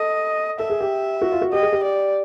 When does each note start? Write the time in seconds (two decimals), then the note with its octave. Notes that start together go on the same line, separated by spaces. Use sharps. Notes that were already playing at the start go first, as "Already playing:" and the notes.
Already playing: A4 D#5
0.59 A4 E5
0.70 G#4
0.81 G4
1.22 F#4
1.32 F4
1.42 F#4
1.52 G4 D#5
1.62 G#4
1.73 G4
1.83 D5